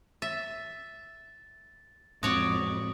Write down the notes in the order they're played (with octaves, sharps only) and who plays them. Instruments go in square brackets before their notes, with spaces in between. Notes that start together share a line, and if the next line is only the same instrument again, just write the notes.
[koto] E5 [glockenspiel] A6
[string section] F2 [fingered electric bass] A2 G#3 C4 [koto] F#4 C#5 D5 [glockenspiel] D#6